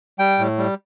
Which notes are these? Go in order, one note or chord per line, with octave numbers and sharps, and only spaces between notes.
G3 G5
A2
G3